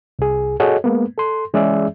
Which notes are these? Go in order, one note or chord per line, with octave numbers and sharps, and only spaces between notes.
C2 G#4
F#4 G#4 A4 C#5 D#5 F#5
G#3 A#3 B3
A4 C6
E3 G#3 C#4 G#4 D5 E5